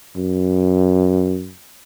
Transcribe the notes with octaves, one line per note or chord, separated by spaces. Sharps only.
F#2